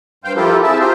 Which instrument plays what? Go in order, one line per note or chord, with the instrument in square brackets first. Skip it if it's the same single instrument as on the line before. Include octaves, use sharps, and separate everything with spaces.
[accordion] G2 C5 F5 G5
F3 E4 F4 G4 A4 A#4
C4 E4 G#4 E5 A5
F4 G4 A#4 C5